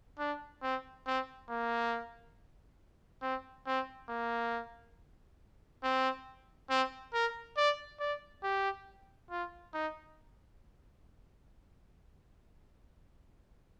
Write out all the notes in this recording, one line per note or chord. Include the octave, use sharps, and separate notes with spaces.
D4
C4
C4
A#3
C4
C4
A#3
C4
C4
A#4
D5
D5
G4
F4
D#4